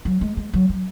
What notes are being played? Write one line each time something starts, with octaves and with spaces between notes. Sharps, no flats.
F#3
G#3
G#3
F#3
F#3